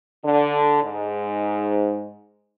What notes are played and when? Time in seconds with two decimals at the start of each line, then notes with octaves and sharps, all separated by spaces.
0.24 D3
0.83 G#2